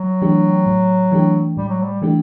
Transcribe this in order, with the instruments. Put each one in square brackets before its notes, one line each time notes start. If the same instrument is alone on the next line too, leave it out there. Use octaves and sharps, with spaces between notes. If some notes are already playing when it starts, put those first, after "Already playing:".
Already playing: [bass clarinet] F#3
[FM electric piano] E3 A3 D4 G4
A2
E3 A3 D4 G4
[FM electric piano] A2 [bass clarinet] G3
[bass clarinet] F#3
G3
[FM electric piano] E3 A3 D4 G4